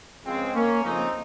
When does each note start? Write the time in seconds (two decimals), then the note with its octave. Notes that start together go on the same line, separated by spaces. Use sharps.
0.25 C#2 C#3 F3 G#3 C4
0.54 A#3 C#4
0.84 F2 C#3 F3 C4 D#4